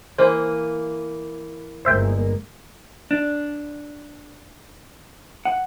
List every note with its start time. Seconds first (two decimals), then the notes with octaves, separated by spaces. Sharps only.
0.18 E3 A#3 C5
1.85 G1 G#3 A#3 C5 E5 G5
3.11 D4
5.45 F#5